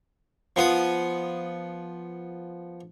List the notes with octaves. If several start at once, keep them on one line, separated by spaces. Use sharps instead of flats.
F3 B3 D#6